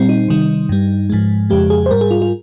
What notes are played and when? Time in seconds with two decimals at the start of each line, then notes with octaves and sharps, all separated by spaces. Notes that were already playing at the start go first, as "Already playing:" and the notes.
Already playing: A#2 G3 C4
0.09 D#4
0.29 C3 D#3 G3
0.69 G2 G3
1.10 G#2 F3 G#3
1.50 F2 C#3 F3 G#3 G4
1.70 G#4
1.86 C5
1.91 G#2 G3 A#4
2.01 G#4
2.11 F4
2.22 F4